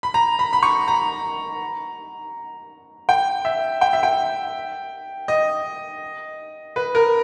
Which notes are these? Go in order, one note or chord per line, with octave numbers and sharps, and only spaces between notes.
B5
A#5
B5
B5
C#6
A#5
G5
E5
G5
E5
G5
D#5
B4
A#4